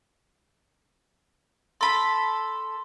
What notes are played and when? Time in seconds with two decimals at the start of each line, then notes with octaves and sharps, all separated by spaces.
1.81 A4 B5 C6